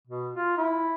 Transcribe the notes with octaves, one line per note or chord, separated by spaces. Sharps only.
B2
F4
E4